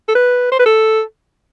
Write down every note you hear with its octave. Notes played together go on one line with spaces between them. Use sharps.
A4
B4
C5
B4
A4